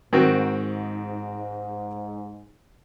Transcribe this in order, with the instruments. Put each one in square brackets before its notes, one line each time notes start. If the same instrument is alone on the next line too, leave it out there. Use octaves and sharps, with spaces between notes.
[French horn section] G#2 [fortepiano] D#3 C4 F#4